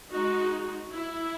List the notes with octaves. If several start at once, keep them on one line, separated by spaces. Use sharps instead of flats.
G#3 D#4 F#4
E4